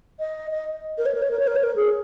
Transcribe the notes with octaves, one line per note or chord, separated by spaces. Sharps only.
D#5
D#5
A#4
C#5
A#4
C#5
A#4
C#5
A#4
C#5
A#4
G#4